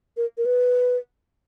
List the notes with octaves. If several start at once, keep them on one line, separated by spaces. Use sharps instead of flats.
A#4
A#4
B4